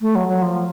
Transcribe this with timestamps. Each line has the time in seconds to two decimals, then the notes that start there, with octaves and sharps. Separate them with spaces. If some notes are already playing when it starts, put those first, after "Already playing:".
0.01 A3
0.15 F#3
0.28 F#3
0.42 F3